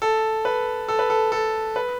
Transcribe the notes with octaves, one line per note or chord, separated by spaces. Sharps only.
A4
B4
A4
B4
A4
A4
B4